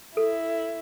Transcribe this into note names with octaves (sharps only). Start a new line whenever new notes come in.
E4 A4